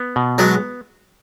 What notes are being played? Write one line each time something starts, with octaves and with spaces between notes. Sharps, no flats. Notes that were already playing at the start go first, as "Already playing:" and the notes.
Already playing: B3
B2
F#3 G#3 B3